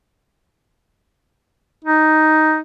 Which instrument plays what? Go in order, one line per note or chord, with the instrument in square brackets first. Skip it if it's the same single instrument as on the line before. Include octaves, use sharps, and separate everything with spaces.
[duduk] D#4